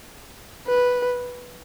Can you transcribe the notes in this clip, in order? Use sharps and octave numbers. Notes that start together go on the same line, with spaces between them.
B4